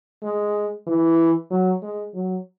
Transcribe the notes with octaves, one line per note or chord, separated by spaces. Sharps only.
G#3
E3
F#3
G#3
F#3